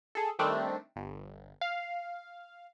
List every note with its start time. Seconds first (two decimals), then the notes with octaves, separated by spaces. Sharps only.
0.15 G#4 A4
0.39 D#3 G3 A3 C4 D4
0.96 G1
1.61 F5